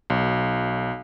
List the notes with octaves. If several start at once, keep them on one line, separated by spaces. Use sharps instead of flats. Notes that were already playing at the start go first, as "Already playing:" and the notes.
B1